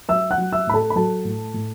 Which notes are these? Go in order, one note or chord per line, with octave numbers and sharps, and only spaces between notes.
F#3 E5 E6
F#5 F#6
F#3
E5 E6
A2 B5
A4 A5
B5
F#3 A4 A5
A2
A2